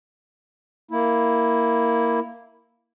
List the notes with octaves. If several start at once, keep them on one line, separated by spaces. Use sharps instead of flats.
A#3 E4